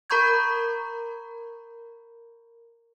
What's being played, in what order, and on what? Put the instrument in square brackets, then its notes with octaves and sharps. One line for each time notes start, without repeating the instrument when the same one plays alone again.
[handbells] A#4 A#5 B5 C#6 G6 G#6